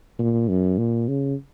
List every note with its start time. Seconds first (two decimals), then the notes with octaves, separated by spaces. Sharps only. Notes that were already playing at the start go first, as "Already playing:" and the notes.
0.19 A#2
0.49 F#2
0.78 A#2
1.08 C#3